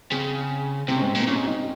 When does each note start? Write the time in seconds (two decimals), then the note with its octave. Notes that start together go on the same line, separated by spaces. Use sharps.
0.11 C#3 C4
0.88 C3 C4
0.96 C#4
1.02 G#2 C4
1.15 A#2
1.20 C4
1.27 A#2 C#4
1.36 G#2
1.47 D#4